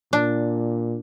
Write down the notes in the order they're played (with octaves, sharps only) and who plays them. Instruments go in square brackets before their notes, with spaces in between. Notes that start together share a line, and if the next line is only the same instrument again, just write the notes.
[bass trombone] A#2 [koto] D4